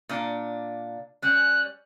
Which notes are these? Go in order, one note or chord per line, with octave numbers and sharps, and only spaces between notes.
A#2 D4
G3 C#4 F#6